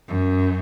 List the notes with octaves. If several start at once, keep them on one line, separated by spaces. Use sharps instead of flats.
F#2